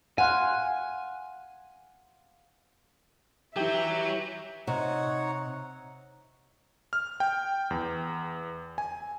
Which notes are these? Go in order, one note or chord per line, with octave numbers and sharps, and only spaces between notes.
F5 F#5 G#5 C6
E3 F#3 G4 E5
C3 D#4 C#5 F#5
F6
G5
E2
G#5